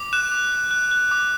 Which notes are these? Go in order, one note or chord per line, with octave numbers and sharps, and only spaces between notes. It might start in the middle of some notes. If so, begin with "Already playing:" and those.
Already playing: D6
F#6 E7
D6
F#6
F#6
F#6
D6